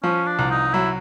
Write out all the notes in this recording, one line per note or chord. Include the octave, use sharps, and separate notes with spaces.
F3 C#4
D4
C2
D#4
F#3 E4